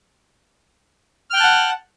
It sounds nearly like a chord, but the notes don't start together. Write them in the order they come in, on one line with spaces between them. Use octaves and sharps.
F6 G5 F#6 A5 F#5